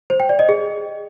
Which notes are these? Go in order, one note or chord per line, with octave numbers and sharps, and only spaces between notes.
C5
G5
D5
D#5
G#4